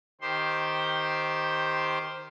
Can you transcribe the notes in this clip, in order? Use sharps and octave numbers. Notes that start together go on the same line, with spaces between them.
D#3 G4 C5 C6